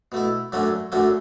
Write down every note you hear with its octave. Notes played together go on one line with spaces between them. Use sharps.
B2 A3 E4
F#2 D3 F#3 A3 C#4
F#2 D3 F#3 A3 C#4